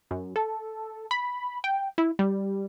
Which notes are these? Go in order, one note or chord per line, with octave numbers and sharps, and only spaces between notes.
F#2
A4
B5
G5
E4
G3